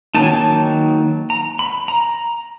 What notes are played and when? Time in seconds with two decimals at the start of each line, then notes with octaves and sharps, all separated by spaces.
0.14 D#3 F#3 A#3 D#4 A5
0.23 G#5
0.30 A5
1.30 A#5
1.59 B5
1.88 A#5